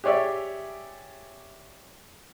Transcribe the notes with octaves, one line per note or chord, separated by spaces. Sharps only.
G4 G#4 C#5 D5 E5